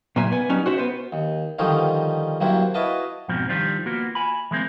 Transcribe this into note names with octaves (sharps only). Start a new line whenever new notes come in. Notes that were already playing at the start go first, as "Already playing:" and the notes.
A#2 F#3 A#3 E5 G#5
B3 G#5
F#3 G3 C#4 D#4
F#4 C5 E5
B3 C5
D#2
D3 D#3 F3 G3 C#4 D#4
G2 F#3 A#3 C4 E4
E4 F#4 B4 D#5 F5 A5
F2 G#2 B2 F3 C4
D#3 F3 G3 D4 F4
A#3 B3 F4 F#4
G#5 B5
E3 G#3 A#3 C4